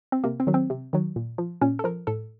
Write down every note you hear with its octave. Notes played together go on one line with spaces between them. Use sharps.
C4
C3 A#3
C4
D#3 F#3
C4
C3
D#3 F#3
A#2
F3
A#2 C#4
A4
F3 A#4
A2 A4